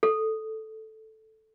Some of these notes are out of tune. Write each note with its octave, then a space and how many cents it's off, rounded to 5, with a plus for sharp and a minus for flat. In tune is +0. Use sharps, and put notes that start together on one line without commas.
A4 -5